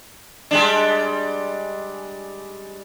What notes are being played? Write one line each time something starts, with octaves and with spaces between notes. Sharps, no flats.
G3 G#3 D4